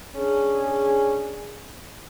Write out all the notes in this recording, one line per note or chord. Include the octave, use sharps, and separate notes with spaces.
C#4 D4 G#4